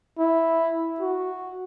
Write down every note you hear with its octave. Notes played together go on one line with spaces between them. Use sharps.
E4
F#4